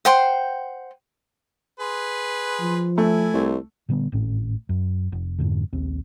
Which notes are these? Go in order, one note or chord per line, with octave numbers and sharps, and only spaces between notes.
C5 F#5 G5 C6
G#4 B4 C6
F3
A3 E4 G#5
C2
A#2 D3 G3 B3
G#1 A2 C#4
F#2
F1
F2 G#2 D3
A#1 D#2 C4